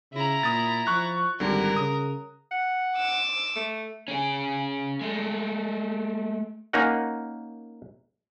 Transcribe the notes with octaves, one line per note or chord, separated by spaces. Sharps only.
C#3 E4 A#5
A#2 D#6 A6
F3 C#6 F#6
G#1 D3 G3 A#4
C#3 D#6
F#5
D6 E6
A3
C#4 G#4
G#3 A3
A#3 C#4 D#4 A#4 D#5 F#5